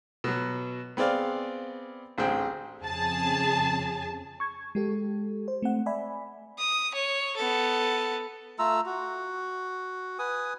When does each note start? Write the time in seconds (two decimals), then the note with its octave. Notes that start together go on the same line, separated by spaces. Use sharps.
0.24 B2 F#3
0.97 B3 C4 G#4 D5 F5
2.18 A1 D2 C4 G#4 G5
2.81 F2 C#3 G#4 A5
4.40 C#6 G#6
4.75 G#3 G4 A4
5.48 C5
5.62 A3 C4 F#5
5.86 D5 E5 G#5 B5
6.58 D#6
6.95 C#5
7.37 B3 A4
8.59 A3 F4 A#5 E6
8.86 F#4
10.19 B4 G#5 D#6